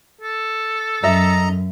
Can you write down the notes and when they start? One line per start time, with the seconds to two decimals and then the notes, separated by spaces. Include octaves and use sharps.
0.21 A4
1.04 F#2 D#5 E5 A#5